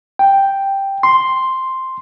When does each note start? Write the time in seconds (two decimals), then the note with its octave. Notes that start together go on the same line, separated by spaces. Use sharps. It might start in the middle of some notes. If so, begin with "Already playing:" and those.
0.19 G5
1.03 C6